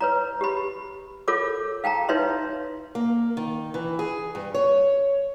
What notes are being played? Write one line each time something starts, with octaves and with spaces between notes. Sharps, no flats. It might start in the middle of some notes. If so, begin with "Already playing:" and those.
B4 C#5 A#5
G4 B5
F4 A4 A#4 C#5 D6
F5 G5 A5 A#5
D#4 B4 C#5 E5 C6
A#3
D#3
E3
G#4
G2
C#5